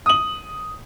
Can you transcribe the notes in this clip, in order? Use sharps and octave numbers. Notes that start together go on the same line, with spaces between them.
D#6 F#7